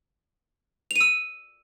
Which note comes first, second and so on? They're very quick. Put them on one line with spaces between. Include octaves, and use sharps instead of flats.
F7 D#7 E6